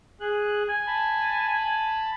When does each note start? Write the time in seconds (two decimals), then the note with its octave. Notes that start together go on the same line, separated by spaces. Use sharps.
0.21 G#4 F#6
0.69 G#5
0.87 A5 B5